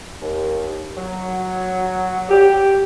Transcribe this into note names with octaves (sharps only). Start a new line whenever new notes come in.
D#2
F#3
G4